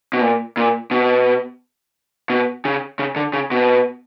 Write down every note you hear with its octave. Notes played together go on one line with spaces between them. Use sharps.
B2
A#2
A#2
B2
B2
C#3
C#3
D3
C#3
B2